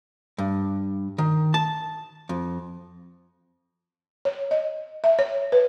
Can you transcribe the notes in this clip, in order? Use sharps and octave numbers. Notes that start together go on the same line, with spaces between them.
G2
D#3
A5
F2
C#5
D#5
E5
C#5
B4